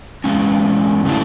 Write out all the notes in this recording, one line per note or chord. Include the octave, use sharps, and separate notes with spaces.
E2 B2 G#3 C#4
C#3 E3 A3 D4